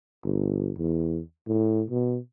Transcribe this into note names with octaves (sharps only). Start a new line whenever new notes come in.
G1
E2
A2
B2